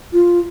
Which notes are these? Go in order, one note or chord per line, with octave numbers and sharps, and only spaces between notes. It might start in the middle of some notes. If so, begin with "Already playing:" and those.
F4